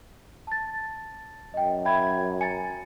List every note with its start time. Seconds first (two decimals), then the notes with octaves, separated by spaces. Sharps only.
0.47 A5 A6
1.54 F#2 D#5 G5
1.85 E5 G5 B5 G#6
2.41 G#5 A#5 A6 C#7